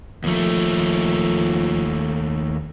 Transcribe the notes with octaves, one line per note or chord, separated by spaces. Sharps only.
D#2 F3 A3